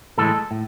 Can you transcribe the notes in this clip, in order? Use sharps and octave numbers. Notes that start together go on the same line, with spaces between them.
A2 E3 G#3 A4
A2